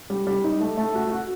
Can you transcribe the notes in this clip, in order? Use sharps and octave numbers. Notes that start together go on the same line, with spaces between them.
G3
G3
D#4
A3
A3
F#4
F#4